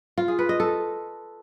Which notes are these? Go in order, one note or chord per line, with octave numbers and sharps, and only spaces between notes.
F4
G#4
B4
D#5
A4